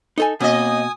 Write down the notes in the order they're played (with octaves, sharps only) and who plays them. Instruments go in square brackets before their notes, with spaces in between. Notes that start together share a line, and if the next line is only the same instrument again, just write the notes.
[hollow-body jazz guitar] D#4 A4 G#5
[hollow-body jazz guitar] B2 [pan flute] A#3 [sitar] C4 D#5 [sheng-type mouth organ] G#5 D#6